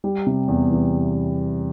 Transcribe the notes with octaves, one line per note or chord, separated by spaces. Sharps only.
G3
C3
E2
E3